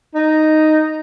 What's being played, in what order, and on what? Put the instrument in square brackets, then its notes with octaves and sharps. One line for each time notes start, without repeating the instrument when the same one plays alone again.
[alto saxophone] D#4